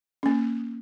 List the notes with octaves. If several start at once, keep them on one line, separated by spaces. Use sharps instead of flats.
A#3 C#4